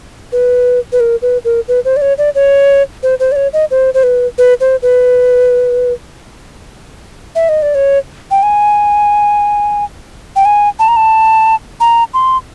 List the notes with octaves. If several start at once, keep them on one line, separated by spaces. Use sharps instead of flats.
B4
B4
A#4
B4
A#4
B4
C5
D5
C#5
D5
C#5
C5
C5
D5
C#5
D#5
C5
C5
B4
B4
C5
B4
E5
D#5
D5
C#5
G5
G#5
G5
G#5
A5
A#5
A5
A#5
C6